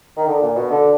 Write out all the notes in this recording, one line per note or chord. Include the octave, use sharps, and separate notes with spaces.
D#3
D3
A#2
B2
D3